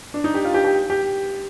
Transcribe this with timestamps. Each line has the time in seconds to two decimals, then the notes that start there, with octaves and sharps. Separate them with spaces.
0.14 D4
0.24 D#4
0.34 G4
0.44 F4
0.54 G4
0.64 G4
0.90 G4